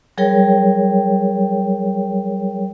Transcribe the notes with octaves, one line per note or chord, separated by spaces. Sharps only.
F#3 G3 G#4 A#4 C#5 G5